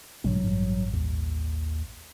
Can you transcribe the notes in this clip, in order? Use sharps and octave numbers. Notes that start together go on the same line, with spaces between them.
B1 G#2 D3 F#3
A1 G2
D#2